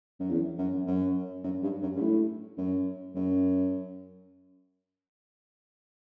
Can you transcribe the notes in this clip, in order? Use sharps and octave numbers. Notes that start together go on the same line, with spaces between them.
F#2
E2
F#2
F#2
F#2
G2
F#2
G2
A2
F#2
F#2